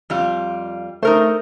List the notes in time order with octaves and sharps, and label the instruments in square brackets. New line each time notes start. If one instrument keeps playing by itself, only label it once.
[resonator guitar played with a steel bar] F2 G3 F4
[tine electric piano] A3 [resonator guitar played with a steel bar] D#4 A#4 C5